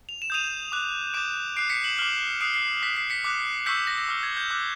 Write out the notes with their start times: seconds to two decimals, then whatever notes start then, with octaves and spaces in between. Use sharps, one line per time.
0.09 F7
0.22 E7
0.30 D#6 G6 D#7 F7
0.72 D6 F#6
1.14 D6 G6 D7 E7
1.56 D6 F#6 C7 D7
1.70 B6 C#7
1.84 E7 F#7
1.98 D6 F6 E7 F#7
2.41 D#6 F#6 C7 D7
2.54 C7
2.82 D6 F#6 B6
2.96 C7
3.10 B6 C#7
3.24 D6 F#6
3.66 C#6 E6 G6 B6 C#7
3.77 B6
3.87 A#6
3.98 A#6
4.09 D6 F6
4.23 G#6
4.37 G6
4.51 D6 F#6